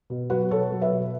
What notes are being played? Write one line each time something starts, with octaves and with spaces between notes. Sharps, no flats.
B2
F#3 F#4 B4
B2 A4 C#5
F#3
B4 E5
B2